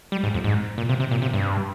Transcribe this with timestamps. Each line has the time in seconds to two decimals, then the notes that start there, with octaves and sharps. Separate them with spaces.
0.12 G3
0.23 G#2
0.34 F2
0.44 G#2
0.78 A#2
0.89 C3
1.00 C3
1.11 A#2
1.22 C3
1.33 G2